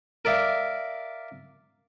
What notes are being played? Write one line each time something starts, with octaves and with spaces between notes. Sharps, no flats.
A#4 D5 E5 F5